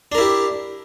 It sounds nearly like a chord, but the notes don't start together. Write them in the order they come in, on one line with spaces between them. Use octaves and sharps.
D4 A#4 E4 G4